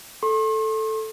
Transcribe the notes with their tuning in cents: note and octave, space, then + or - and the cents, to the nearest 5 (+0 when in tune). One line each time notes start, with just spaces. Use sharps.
A4 +0 C6 +45